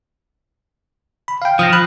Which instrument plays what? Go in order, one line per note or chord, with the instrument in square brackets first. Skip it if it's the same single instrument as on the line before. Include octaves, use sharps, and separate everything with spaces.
[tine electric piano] B5
F5 G5
[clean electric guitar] F3 [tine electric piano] D#6 F6 A#6
[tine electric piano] B5 F#6